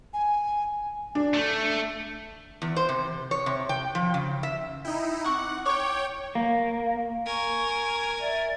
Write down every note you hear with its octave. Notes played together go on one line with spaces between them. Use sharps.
G#5
D4
A3
E2
C5
C3
C#5
C3
G5
F3
C#3
E5
D#4 E4 G5
C4 F#5 C#6 D6
C#5 G5 C#6 D6
A#3
A#4 G#5 C#6
D5 E5